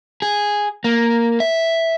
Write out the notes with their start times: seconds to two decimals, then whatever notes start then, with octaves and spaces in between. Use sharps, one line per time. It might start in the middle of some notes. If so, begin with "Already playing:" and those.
0.22 G#4
0.84 A#3
1.40 E5